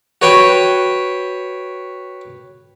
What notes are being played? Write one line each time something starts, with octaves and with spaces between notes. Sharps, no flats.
F#4 B4 C#5 G5